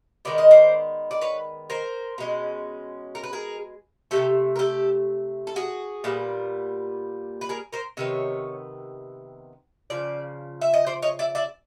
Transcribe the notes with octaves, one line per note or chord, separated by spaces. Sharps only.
D#3 G#3 B3 D5
D#5
C5 D5
D5
B4 C#5
A#4 C5
B2 G#3 C#4
A#4
B4
G#4 A#4
C3 F3 A3 G4 A4
A#4
G4 A4
A4
F#4 G#4
A#2 G3 B3
B4
G#4 A#4
A#4 C5
C3 D#3 B3 C#5
C#3 F3 D5
E5
D#5
C5 D5
C#5 D#5
D5 E5
D5 E5